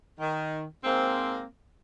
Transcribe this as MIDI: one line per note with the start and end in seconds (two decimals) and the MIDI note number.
0.20 0.64 51
0.84 1.43 44
0.84 1.43 58
0.84 1.43 60